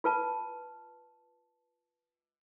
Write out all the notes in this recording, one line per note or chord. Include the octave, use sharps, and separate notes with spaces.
F4 B4 A5